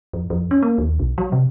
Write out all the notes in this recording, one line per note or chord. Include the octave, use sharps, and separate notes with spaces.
F2
F2
C#4
A#3
D#2
B1
F#3
C3